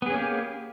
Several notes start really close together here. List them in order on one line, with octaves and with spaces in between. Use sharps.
B3 G#4 C#4 A#3 G4